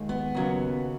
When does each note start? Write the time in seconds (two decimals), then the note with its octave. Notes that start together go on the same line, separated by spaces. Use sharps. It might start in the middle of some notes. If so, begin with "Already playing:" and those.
Already playing: D#2 D#3 G#3
0.09 B3
0.35 D#2 C#3 F#3